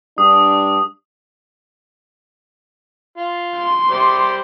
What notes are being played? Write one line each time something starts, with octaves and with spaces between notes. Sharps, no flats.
G2 D4 D#6
F4
C6
G3 C5 D6